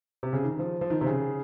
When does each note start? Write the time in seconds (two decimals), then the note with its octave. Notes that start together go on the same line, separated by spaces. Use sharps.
0.23 C3
0.33 C#3
0.44 D#3
0.59 F3
0.81 F3
0.90 D#3
1.01 C3
1.06 C#3